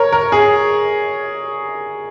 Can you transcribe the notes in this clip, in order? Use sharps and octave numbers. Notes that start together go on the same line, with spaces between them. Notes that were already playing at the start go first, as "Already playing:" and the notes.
Already playing: A#4 C#5
A#4
G#4